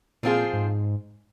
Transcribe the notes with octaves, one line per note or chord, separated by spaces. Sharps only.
A#2 F3 C4 F4 G#4
G#2